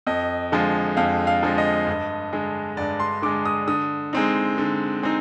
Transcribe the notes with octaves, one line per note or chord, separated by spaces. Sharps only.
F2 D#5
D3 F3 G#3
F2 F5
F5
D3 F3 G#3
D#5
G2
D3 G#3
G2 D5
C6
D3 G#3 D6
D#6
D3 D#6
G#3 C4 D#4
D3
G#3 C4 D#4